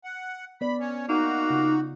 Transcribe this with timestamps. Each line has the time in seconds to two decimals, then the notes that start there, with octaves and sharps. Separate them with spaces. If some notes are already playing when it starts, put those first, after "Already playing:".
0.04 F#5
0.61 B3 D5 B5
0.80 C#4 C#5
1.09 A#3 D#4 F#4
1.50 C#3 F4